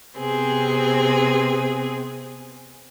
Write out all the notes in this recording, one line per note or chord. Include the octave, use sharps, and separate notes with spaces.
C3 B3 C4 G#4